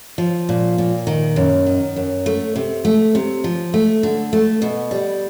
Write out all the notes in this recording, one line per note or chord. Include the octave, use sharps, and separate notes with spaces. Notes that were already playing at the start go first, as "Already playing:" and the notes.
F3
A#2
A#2
D#3
F#2
D#3
F#2
A3
C3
A3
C3
F3
A3
D3
A3
B2
G3